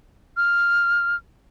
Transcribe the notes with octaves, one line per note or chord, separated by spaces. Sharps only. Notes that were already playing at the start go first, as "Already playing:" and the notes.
F6